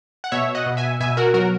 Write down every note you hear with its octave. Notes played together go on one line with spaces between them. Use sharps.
F#5
B2 C#5 E5
D#5 F#5
B2
E5 G#5
B2 E5 G#5
F#4 A#4
F#3 F#4 A#4